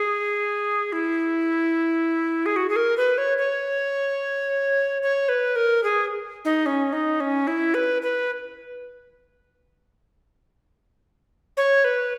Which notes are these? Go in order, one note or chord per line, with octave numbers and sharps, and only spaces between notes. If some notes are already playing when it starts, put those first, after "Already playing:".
Already playing: G#4
E4
G#4
F#4
G#4
A#4
B4
C#5
C#5
C#5
B4
A#4
G#4
D#4
C#4
D#4
C#4
E4
B4
B4
C#5
B4